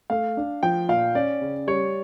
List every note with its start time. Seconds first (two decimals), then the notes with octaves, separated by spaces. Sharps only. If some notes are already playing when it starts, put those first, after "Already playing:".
0.10 A3 F5
0.37 D4
0.63 F3 G5
0.88 A#2 F5
1.15 C#4 D5
1.41 C#3
1.67 G3 C#5